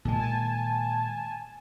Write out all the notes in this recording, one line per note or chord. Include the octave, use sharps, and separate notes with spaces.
A#2 D#3 G#3 G#5 A5